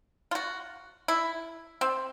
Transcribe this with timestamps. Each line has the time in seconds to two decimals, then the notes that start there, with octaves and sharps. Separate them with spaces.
0.31 F4
0.35 F#4
1.08 E4
1.81 C4